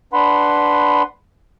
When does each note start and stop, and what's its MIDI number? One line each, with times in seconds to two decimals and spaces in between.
0.13 1.02 62
0.13 1.02 71
0.13 1.02 78
0.13 1.02 83
0.13 1.02 84